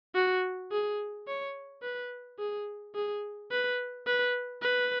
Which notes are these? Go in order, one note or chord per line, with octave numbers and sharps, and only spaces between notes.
F#4
G#4
C#5
B4
G#4
G#4
B4
B4
B4